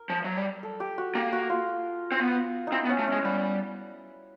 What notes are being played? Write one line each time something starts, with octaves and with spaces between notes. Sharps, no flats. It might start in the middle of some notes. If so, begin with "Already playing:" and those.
Already playing: A#4
F3
F#3
G3
A4
G4
F#4
A#3 G4
F#4
F4
C4
B3
D#4
C4 E4
B3
C#4
A3
G#3 C#4
G3 B3